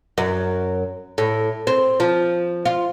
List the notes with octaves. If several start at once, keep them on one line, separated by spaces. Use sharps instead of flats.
F#2
A2
C4
F3
F4